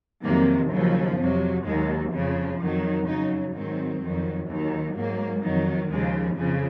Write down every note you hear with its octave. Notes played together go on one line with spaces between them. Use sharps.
F2 C3 D#3 F#3 A#3
D#2 C#3 F3 F#3
F2 C3 F#3
D#2 D#3 F#3 G#3
F2 C#3 F3
F2 D#3 F#3
F#2 C#3 F#3 D#4
G#2 D#3 F#3 C4
F2 D#3 F#3
D#2 D#3 F#3
G#2 F#3 A#3
F2 D#3 F#3
D#2 C#3 F3 G#3
F2 C#3 F3